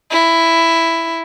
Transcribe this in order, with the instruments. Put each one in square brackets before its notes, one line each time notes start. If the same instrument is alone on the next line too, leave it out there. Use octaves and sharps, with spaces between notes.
[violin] E4